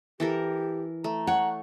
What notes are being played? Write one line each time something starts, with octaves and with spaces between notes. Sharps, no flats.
E3 G4 A4 A#4
A3 A#5
C#5 F#5